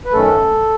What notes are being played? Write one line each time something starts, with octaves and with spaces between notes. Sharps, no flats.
B4
F#2 D#3 A3 C#4 A4